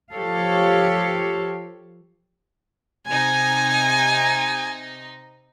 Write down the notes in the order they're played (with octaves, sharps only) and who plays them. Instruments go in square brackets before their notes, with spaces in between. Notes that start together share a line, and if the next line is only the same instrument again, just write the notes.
[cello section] F3 G4 A4 C#5 F5
[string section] C3 D#4 [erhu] G#5